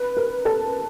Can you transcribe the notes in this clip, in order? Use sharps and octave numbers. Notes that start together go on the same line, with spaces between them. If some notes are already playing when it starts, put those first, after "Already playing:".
Already playing: B4
A#4
A4